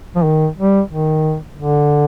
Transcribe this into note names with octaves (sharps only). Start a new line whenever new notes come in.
F3
D#3
G3
D#3
D3